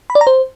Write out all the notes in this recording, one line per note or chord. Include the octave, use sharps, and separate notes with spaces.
B5
D5
A#5
C5